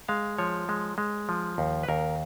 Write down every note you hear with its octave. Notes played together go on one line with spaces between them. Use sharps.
G#3 F5
F3 C#5
G#3
G#3
F3
D#2
B4
D#2 A#4